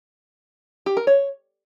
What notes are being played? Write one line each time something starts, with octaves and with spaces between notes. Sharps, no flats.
G4
A#4
C#5